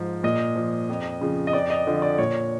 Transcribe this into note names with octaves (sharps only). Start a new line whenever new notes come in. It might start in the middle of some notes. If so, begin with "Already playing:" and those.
Already playing: G#2 F3
A#2 D#5
F3
F2
C#3 F3
D#5
F2 D5
D#5
D3 F3
D5
A#2 C#5